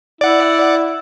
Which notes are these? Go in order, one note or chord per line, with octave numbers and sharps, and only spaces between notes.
E4 D5 F#5